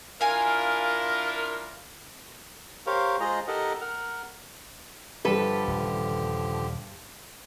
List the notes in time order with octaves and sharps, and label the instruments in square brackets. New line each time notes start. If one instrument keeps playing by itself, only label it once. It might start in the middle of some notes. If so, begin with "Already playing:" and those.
[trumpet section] D4 E4 F4 [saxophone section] A#4 [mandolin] F5 G#5
[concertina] G4 A#4 C5 C#5 F5
G#3 F4 G#4 C5 D#5 A#5
D#4 G4 A4 A#4 D#5 F#5
A#4 F#5 F6
[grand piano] G2 G3 [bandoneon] D3 F3 G4 [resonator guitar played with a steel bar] A4 B4
[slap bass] D#1 C#3